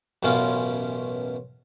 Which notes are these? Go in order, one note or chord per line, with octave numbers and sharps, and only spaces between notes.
A1 F#2 B2 E3 C#4 F4